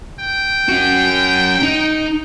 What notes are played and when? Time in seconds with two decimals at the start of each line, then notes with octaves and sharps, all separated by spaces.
0.20 G5
0.68 C#4 F#4
1.62 D#4